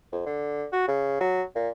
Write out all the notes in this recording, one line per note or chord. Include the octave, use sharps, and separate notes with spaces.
F2
D3
F#4
C#3
F#3
A#2